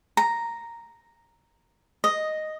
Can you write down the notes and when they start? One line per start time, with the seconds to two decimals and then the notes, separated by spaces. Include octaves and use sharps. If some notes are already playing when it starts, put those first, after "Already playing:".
0.17 A#5
2.04 D#5